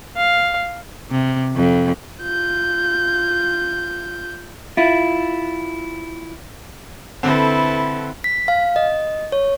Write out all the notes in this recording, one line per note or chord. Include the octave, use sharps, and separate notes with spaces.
F5
C3
F2
F4 G6
E4 F4
D3 C4 E4 A4 B4
B6
F5
D#5
C#5